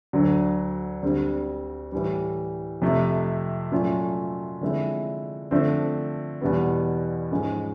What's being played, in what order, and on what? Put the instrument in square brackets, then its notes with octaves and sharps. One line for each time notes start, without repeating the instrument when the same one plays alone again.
[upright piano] D2 D3 F#3
D2 D3 G3 C4
A2 E3 G3
F2 C3 F3 A3
A#2 F#3 A3 C#4 F4
D3 F3 G#3 C4 E4
D3 F3 A3 C4
E2 B2 G3 B3
G#2 F3 G#3 C#4